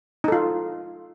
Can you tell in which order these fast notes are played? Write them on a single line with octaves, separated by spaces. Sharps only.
D#4 A4 F4